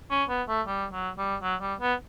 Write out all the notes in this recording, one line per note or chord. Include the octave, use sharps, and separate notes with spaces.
C#4
B3
A3
G3
F#3
G3
F#3
G3
B3